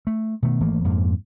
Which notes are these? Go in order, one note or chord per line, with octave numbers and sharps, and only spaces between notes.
A3
B2 D#3 A3
G#1 E3 A3 A#3
F2 G#2 G#3 A#3